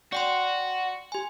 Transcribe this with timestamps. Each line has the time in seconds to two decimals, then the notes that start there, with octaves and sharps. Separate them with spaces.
0.13 F#4 D5 G5 C6
1.12 G4 G#5